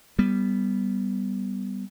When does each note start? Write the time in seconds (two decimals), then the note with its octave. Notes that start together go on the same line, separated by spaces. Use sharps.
0.19 G3 B3